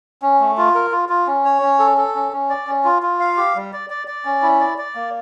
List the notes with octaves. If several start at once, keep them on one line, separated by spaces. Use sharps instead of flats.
C#4
A3
F4
A#4
F4
F4
C#4
C#5
C#4
A4
A4
C#4
C#4
D5
C#4
F4
F4
F5
G4
G3
D5
D5
D5
C#4
E4
D5
D5
A#3